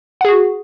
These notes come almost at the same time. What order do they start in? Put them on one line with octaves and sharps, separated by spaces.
F#5 G#4 F#4